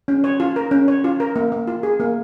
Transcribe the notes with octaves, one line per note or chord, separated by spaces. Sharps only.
C#4
C#5
F4
A#4
C#4
C#5
F4
A#4
A#3
A#3
F4
G#4
A#3